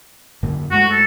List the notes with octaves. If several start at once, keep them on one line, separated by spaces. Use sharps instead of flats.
F#2 D3 A#3
F#2 G#3 A3 F#4
A4